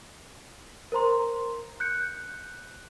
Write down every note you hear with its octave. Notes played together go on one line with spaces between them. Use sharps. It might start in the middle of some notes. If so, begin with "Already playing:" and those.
A#4 C5 A#5 C6
F#6 G6 C#7